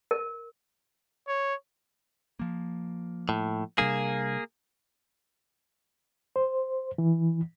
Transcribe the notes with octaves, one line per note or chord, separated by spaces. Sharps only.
A#4
C#5
F3 A#3
A2
C3 G3 A#3 D4 G#4
C5
E3